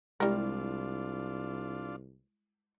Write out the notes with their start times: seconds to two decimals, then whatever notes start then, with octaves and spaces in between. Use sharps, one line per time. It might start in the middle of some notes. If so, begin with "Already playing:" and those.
0.20 C2 G3 G#3 D4 E4 F4 A#4